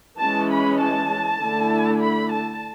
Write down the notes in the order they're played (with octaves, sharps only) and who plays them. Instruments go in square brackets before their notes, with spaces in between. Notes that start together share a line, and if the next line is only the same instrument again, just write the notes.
[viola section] E3 G#3 C#4 A5
B5
A5
D3 A3 E4
B5
A5